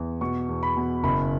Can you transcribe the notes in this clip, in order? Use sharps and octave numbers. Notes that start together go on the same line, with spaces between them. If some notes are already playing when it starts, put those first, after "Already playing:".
Already playing: E2
B2 C#6
E2
B5
B2
F#1 B5